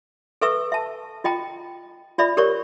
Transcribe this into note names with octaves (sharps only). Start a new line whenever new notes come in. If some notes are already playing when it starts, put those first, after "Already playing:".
A4 B4 E5 C#6 E6
E5 A5
F4 D#5 G5 A#5
F4 D5 E5 B5
G4 A#4 C#5 D5 C#6